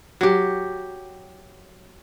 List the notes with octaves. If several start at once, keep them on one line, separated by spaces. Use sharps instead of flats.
F#3 G4